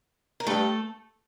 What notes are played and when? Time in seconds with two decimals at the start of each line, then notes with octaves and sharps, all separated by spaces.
0.40 A#4
0.47 G2 A3 A4